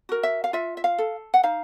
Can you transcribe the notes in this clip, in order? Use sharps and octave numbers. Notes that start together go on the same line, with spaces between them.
F#4 A#4
E5
F5
F4 E5
E5
F5
A4
F#5
D#4 F5